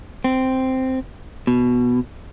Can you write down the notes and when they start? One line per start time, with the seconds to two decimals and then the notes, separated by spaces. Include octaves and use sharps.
0.24 C4
1.47 B2